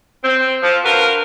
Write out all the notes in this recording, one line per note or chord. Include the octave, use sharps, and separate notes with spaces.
C4
F3
D4 F4 F#4 A#4 B4